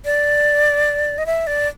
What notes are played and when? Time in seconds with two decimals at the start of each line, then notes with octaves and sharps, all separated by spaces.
0.05 D5
1.18 D#5
1.26 E5
1.47 D5